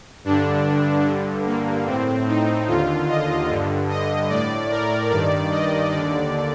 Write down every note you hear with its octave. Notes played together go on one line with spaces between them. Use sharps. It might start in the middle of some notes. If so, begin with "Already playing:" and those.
G2 D3 D4
G2 D3
A#3
A2 C4
D#4
D#2 D3 F4
D#5
G2 D3
D#5
A2 D5
A#4
G2 D#3 D5
D#5
D#2 D3 D5